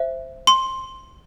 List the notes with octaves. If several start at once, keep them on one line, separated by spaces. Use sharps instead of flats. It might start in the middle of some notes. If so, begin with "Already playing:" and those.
Already playing: C5 E5
C6